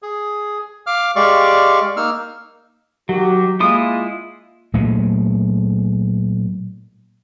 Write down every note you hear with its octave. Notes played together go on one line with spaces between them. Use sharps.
G#4
F5 D6 F6
G#3 G4 D5 F5 C#6
A#3 D#4 E6 F6
D#3 F#3 F#4 G4
G#3 A#3 E4 F4 D#6
A#2 F#3 G#3 A3